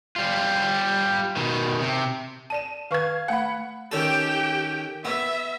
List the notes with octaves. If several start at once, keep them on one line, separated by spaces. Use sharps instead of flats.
G3 F4
B2 D#3
C3
D5 A5 D#7 E7
D#3 B4 F5 C#6 G#6
A3 F5 F#5 B5
D#3 C#4 G4 A4 G5
B3 E5